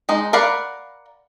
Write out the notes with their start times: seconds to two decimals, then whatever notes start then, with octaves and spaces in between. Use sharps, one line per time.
0.09 G#3 D#4
0.33 A#4 D5 F5 F#5 B5